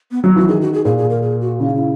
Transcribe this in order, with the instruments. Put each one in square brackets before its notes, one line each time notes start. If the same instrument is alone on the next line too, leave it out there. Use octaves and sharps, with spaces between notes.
[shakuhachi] B3
[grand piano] F#3 [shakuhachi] B3
[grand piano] E3 [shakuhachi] F#4
[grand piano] D#3 [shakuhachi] G#4
[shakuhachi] F#4
G#4
[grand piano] A#2 [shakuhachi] G#4
[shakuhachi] G#4
A#4
G#4
F#4
[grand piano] C#3 [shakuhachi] E4
[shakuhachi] D#4
E4